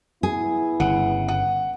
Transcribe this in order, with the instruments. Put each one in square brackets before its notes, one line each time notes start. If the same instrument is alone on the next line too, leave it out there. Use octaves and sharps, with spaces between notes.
[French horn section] B3 E4 [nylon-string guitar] G#4
[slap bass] G1 C#3 [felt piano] F#5
[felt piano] F#5